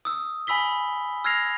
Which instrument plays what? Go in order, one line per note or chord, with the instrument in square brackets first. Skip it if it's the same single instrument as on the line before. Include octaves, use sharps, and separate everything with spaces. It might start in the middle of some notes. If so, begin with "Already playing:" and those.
[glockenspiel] D#6 E6
G#5 B5 E6 B6 G7
E6 F6 G#6 A#6 C7 F7